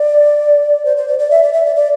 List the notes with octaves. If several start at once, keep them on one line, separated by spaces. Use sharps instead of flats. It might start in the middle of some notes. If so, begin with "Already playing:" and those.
Already playing: D5
C5
C5
D5
D5
E5
D5
E5
D5
D5